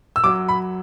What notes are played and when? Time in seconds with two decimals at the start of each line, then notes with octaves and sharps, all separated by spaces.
0.16 E6
0.24 F#2 F#3 D6
0.49 B5